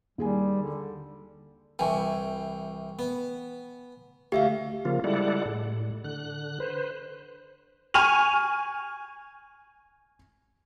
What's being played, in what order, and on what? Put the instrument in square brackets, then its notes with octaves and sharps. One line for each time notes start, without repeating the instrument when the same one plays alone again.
[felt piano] D#2 G#4 G#5 [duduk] G3
[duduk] D3
[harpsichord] C2 E3 [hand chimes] G5 G#5 C#6
[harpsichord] B3
[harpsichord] D2 [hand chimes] G4 E5 F5
[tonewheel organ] C#3 F3 A#3 F4
G3 G#3 E4 A4 D5 F#5
A2
D3 F#6
B4 C5
[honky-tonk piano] G#5 C#6 F6 D#7 F7